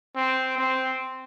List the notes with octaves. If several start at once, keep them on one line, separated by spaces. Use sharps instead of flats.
C4
C4